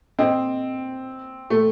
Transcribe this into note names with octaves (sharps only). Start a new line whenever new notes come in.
C4 D4 A4 D#5
A3